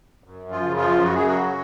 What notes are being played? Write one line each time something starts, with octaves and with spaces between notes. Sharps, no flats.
F#2
F3 F4
C#3
F3 F4
F#2 F#4
G#4
F#3 F#4
F#3